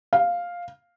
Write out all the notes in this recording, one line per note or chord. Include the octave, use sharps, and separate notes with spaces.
F5